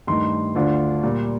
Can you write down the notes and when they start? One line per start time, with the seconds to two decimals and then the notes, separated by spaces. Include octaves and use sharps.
0.07 G2 D#3 A3 D#4 C6
0.55 D2 D3 A3 D4 F4
1.03 A#2 G3 A#3